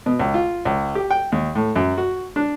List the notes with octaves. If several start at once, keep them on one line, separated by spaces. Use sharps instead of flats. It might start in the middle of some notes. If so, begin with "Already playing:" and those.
B2
C#2
F4
C#2
G4
G5
D#2
A2
F#2
F#4
D4